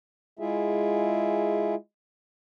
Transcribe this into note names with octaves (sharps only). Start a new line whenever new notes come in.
G#3 E4 F4 G#4 E5